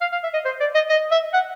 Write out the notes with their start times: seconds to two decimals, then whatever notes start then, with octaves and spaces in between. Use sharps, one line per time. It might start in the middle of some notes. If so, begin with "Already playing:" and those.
0.01 F5
0.12 F5
0.23 E5
0.33 D#5
0.45 C5
0.60 D5
0.75 D#5
0.90 D#5
1.11 E5
1.33 F#5